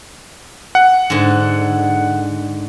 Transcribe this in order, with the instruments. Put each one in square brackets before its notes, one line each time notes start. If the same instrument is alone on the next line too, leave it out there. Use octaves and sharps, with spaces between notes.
[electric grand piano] F#5
[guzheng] G#2 D3